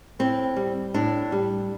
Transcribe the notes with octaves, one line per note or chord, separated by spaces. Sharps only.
A2 C4
G3
A2 D4
G3